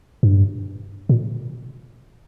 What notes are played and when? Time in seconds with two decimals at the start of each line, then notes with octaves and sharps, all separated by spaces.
0.23 G2
1.09 A#2